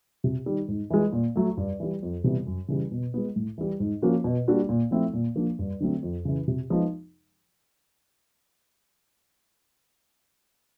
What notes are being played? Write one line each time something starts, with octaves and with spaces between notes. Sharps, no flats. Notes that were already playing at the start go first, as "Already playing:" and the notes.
C3
D#3 G3
G#2
E3 G#3
A#2
F#3 A3
G2
E3 G3
F2
C3 E3 G3 B3
F#2
C#3 E3 G3
B2
G#3 B3
A2
E3 G3
G#2
F3 A#3 C#4 F#4
B2
G3 A#3 D4 F#4
A#2
F3 A3 C4 E4
A#2
F3 A#3 D4
G2
D3 F#3 A3 C4
F2
C#3 E3
C3
F3 G#3 B3 D#4